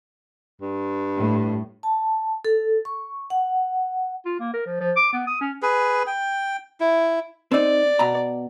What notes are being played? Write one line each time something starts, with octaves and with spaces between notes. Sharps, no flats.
G2
A2
A5
A4
C#6
F#5
F4
A#3
A#4
F3
F3
D6
B3
D#6
C#4
G#4 B4
G5
E4
C4 D#4 D5
B2 A#5